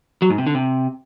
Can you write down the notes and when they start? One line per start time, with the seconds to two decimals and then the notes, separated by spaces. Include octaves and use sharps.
0.22 F#3
0.30 G#2
0.38 C3
0.47 D3
0.55 C3